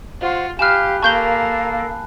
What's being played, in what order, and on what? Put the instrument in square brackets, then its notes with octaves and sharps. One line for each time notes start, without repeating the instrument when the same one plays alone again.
[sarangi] F4 [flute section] F#4 C5
[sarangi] G4 [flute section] F5 [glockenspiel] G#5 B5 F#6 [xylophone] F6 E7
[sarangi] A#3 [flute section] A4 A#4 F5 [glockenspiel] A5 [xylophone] C#6 G6 G7